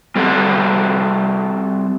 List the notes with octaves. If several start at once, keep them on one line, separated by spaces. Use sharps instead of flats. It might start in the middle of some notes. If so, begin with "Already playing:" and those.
G3 C4 A4 F#5